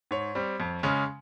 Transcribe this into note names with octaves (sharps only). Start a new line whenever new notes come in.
G#2 C#5
G3 C4
F2
C#3 G#3 C#4